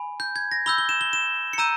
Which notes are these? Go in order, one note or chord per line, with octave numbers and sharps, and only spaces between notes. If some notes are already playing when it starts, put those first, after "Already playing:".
Already playing: G#5 B5
G6
G#6
A#6
B5 E6 G6 G7
G7
E7
G7
E7
C#7
A#5 E6 G6 D#7